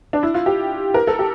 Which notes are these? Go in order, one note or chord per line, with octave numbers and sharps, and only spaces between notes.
D4
E4
F4
G4
A#4
A4
G4